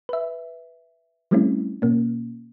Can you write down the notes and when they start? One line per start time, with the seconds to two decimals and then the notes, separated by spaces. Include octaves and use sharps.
0.09 B4 E5
1.31 F3 G3 A3 C4 C#4 E4
1.82 B2 A#3 C#4